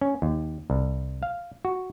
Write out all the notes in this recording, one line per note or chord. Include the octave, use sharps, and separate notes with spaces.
C#4
D#2
C2
F5
F#4